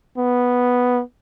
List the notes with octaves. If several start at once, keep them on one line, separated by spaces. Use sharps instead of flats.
B3